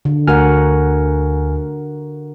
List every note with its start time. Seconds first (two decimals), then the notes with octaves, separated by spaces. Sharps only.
0.05 D3
0.27 D2 F#4 A#4 F#5 G#5 F6